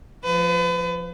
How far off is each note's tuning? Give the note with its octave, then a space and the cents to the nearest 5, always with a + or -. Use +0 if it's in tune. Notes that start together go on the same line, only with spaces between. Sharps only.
F3 +0 B4 +35